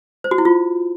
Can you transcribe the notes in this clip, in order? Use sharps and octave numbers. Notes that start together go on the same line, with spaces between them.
C5
F#4
E4
F4